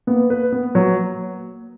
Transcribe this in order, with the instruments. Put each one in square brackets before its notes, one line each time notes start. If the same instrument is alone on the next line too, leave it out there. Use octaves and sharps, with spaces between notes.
[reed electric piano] A#3 [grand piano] B3
[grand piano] B4
B3
F#3